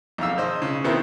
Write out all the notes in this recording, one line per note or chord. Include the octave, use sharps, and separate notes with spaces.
B1 F2 F5 E6
G#1 C5 D#5
C#3
B2 D#3 B3 C4 E4 A#4